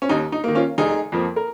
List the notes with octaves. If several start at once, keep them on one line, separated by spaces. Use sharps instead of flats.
C#4
D#2 D#4
D#4
D#3 A#3
C#4 F4
F1 D#4 G#4
F2 F3 A#3
A#4